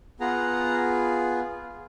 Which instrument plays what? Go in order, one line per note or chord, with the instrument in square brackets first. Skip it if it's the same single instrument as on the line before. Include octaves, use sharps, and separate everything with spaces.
[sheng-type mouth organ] B3 F4 G#4 F#5 A#5